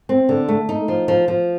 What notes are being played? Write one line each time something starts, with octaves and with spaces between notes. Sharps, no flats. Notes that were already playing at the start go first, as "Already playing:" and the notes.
C4
D3
A3
D#4
F3
F3
F3